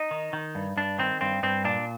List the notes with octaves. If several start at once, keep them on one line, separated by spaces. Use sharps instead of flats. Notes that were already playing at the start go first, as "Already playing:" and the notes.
Already playing: D#4
D#3
D#3
G2
G2 D4
D#3 C4
G2 C4
G2 C4
A#2 D4